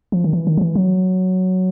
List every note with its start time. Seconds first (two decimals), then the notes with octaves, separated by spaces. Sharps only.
0.12 F3
0.24 D#3
0.33 E3
0.47 D#3
0.57 F3
0.61 E3
0.75 F#3